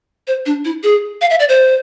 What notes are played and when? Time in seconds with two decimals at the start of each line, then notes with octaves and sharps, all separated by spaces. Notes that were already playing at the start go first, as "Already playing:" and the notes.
0.27 C5
0.46 D4
0.65 E4
0.84 G#4
1.21 F5
1.30 E5
1.40 D5
1.49 C5